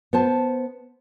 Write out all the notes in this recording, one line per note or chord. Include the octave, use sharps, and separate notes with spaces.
B3 C5 A5